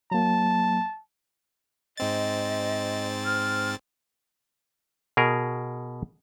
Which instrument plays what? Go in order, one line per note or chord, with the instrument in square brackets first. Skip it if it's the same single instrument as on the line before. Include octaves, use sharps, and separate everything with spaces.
[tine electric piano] F#3 A#3 [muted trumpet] A5
[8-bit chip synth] G#2 C4 A6 [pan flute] D#5
[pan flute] F6
[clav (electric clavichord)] B2 G#4 A#4